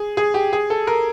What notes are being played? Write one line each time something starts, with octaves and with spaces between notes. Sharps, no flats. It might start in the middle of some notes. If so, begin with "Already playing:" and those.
Already playing: G#4
G#4
G4
G#4
A4
A#4